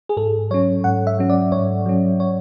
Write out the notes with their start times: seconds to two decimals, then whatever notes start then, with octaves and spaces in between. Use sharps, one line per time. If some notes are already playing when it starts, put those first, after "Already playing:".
0.09 G#4
0.17 G#2 A4
0.50 F#3 C#4 C#5
0.84 G#2 F#5
1.07 E5
1.19 F#3 C#4
1.30 D5
1.52 G#2 C#5
1.86 F#3 C#4
2.20 C#5